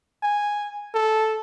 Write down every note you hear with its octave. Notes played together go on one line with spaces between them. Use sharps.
G#5
A4